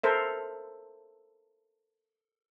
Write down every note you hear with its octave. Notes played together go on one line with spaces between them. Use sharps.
A4 A#4 C5 E5